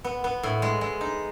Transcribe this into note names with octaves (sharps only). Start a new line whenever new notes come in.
B3
B3
A2
G#3
G#3
D#4